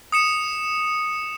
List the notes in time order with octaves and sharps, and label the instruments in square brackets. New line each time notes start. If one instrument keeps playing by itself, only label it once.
[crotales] D#6 C#7 E7